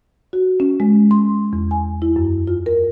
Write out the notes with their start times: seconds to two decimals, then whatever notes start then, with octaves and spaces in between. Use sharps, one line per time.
0.33 F#4
0.60 C#4
0.80 G#3
1.11 C6
1.53 E2
1.71 G#5
2.02 E4
2.16 F#2
2.47 F4
2.66 A#4